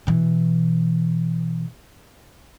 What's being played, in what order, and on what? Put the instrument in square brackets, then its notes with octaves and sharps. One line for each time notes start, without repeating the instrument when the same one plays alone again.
[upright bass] B2 E3